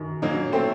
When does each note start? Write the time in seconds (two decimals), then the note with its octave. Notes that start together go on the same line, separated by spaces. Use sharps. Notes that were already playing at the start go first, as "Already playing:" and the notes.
Already playing: F#2 D#3
0.22 F#3 A#3 D#4
0.52 A3 C4